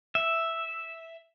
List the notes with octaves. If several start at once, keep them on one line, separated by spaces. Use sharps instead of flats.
E5